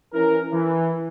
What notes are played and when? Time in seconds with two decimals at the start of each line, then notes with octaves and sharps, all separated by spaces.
0.14 E3 C#4 A#4
0.52 E3